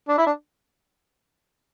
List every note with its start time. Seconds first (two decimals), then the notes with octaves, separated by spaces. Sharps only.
0.09 D4
0.18 E4
0.27 D4